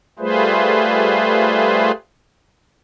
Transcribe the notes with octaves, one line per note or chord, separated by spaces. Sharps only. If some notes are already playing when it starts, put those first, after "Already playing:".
G3 A3 F4 G#4 B4 C5